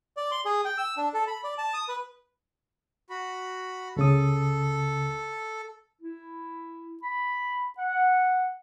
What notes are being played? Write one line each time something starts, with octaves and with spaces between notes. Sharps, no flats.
D5
C6
G#4
G5
E6
D4
A4
B5
D5
A5
D#6
B4
F#4 B5
C#2 C#3 A4 D#6
E4
B5
F#5